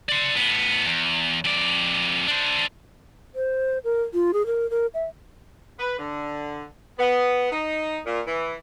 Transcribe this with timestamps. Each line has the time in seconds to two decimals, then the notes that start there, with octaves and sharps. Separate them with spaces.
0.09 D5 C6
0.35 A2 B3
0.85 E2
1.45 F2 D5
2.28 D4 C5
3.34 C5
3.84 A#4
4.14 F4
4.34 G#4
4.46 A#4
4.70 A#4
4.94 E5
5.79 B4
5.98 D3
6.99 B3
7.52 D#4
8.06 A#2
8.27 E3